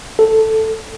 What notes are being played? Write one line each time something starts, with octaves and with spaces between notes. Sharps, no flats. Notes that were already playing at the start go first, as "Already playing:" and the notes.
A4